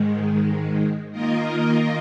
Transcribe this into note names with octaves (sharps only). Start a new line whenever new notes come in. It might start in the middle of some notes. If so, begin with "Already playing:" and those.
Already playing: G#2 D#3 G#3
D#3 A#3 F4 A#4 D#5